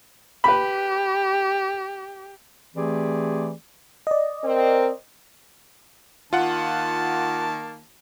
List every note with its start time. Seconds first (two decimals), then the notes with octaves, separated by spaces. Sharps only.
0.44 G4 B4 B5
2.76 E3 A3 C4 G4 G#4 D5
4.07 D5 D#5
4.44 C4 A#4
6.33 D#3 A#3 F4 F#5 A5